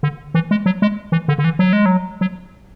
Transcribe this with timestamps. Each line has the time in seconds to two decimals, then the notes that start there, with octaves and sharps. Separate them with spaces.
0.03 D3
0.34 E3
0.51 G#3
0.66 F#3
0.82 G#3
1.12 E3
1.28 D3
1.38 D3
1.44 E3
1.59 F#3
1.73 G#3
1.86 F#3
2.21 F#3